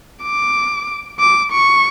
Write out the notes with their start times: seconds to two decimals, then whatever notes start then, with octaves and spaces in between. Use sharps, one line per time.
0.23 D6
1.20 D6
1.52 C#6